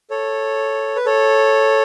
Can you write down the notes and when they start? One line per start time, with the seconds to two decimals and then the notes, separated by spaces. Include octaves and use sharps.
0.10 A4 C#5
0.96 B4
1.06 A4 C#5